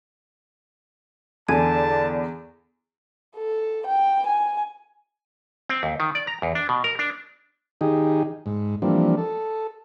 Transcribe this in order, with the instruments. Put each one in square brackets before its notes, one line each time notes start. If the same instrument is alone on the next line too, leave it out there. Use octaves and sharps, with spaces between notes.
[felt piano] E2 [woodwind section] D3 [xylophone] G#5 G#6 [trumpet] A5
[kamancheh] A4
G5
G#5
[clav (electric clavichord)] C4
D#2
D#3
D5
A#5
E2
D4
B2
A#4
D4
[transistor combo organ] D#3 D#4 G4 G#4
G#2
E3 F3 G3 A#3 C4 D4
A4